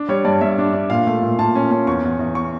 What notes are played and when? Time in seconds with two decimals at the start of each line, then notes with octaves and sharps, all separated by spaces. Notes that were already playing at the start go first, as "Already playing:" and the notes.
Already playing: D4
0.09 G3 C#5
0.25 G2 D5
0.41 G2 E5
0.58 D4
0.74 D4
0.90 A#2 F5
1.07 A3
1.22 A#2
1.39 A#2 A5
1.55 C#4
1.71 C#4
1.87 E2 C#6
2.04 E2
2.19 E2
2.35 C#6